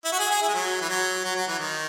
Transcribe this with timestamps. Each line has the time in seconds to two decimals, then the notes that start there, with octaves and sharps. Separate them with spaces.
0.05 E4
0.12 F#4
0.20 G#4
0.30 G#4
0.42 E4
0.48 G#3
0.54 F#3
0.81 E3
0.89 F#3
1.24 F#3
1.36 F#3
1.47 E3
1.59 D#3